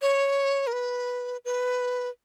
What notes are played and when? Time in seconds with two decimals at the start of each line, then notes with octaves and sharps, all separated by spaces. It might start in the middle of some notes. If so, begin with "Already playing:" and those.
0.02 C#5
0.67 A#4
0.73 B4
1.45 B4